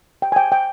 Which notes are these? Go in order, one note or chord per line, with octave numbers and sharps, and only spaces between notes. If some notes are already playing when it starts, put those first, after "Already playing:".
G5
G#5
G5
G5